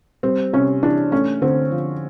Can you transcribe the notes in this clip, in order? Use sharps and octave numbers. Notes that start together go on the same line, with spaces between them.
G3 C4
C3 C#4
E3 D4
A3 C#4
D3 C4
F3